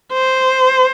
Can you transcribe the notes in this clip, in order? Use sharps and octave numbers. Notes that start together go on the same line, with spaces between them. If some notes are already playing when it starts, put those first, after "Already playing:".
C5